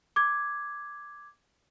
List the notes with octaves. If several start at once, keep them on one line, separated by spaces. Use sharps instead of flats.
D6 G#6